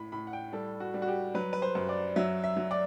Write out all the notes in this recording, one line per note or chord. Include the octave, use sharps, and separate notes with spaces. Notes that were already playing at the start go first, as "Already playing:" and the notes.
Already playing: A2 B5
A2 B5
F#5
G5
G3 A4
F#4
G3
F#4
G4
F#3 B4
B4
C5
F#2
D5
F#3 E5
E5
F#3
D5